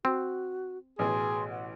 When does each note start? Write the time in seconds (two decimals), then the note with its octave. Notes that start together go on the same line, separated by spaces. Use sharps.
0.05 C4 F#4
0.99 A1 B2 G#4 C6
1.51 F#5